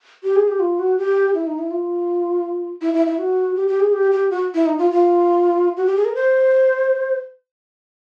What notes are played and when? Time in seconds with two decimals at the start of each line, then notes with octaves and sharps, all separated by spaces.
0.23 G4
0.36 G#4
0.48 G4
0.60 F4
0.79 F#4
0.98 G4
1.34 E4
1.47 D#4
1.59 E4
1.71 F4
2.81 E4
2.94 E4
3.07 E4
3.18 F#4
3.56 G4
3.68 G4
3.80 G#4
3.93 G4
4.12 G4
4.30 F#4
4.55 E4
4.66 D#4
4.78 F4
4.91 F4
5.77 F#4
5.86 G4
5.96 G#4
6.05 A#4
6.15 C5